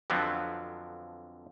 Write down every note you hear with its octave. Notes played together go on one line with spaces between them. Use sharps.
F2 D3 F3 F#3 B3 C4